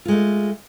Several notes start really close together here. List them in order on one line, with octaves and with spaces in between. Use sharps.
F4 G#3 A3